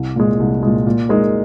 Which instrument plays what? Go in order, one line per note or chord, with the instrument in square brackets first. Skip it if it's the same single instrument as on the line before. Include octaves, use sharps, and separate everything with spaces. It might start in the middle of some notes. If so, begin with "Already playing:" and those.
Already playing: [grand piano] C2
A#2 G#3
C2
A#2 G#3
A#2
G#3 D#4 A#4